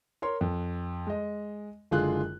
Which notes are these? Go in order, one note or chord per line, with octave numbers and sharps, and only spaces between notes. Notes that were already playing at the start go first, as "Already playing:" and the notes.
A#4 C#5 C6
F2
G#3 D#5
F#1 D3 G#3 F4 G#4 F#6